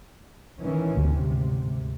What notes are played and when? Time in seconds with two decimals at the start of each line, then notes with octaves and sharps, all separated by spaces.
0.60 D#3 E3 C#4
0.97 G#1 D2 C3